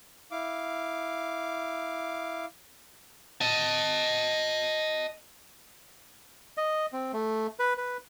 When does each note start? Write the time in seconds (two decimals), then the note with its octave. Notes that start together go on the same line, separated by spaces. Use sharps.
0.31 E4 F5 D6
3.41 D#5 A5
6.58 D#5
6.93 C4
7.13 A3
7.59 B4
7.78 B4